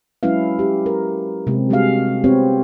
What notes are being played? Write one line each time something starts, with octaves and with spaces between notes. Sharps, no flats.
F#3 G#3 C#4 E4 B4 F5
G4
A#4
C3 G#3 C4
G3 G#3 D4 F#4 G#4 F5
B3 C4 F4 G4 B4 C#5